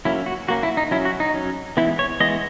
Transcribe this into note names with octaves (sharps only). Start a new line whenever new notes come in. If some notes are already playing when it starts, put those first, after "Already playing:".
F#3 A#3 C#4 E4
F#4
F#3 A#3 C#4 F#4
E4
D#4
F#3 C#4 E4
F#4
D#4
F#3 C#4
E3 G#3 B3 E4
C#5
E3 G#3 B3 D#5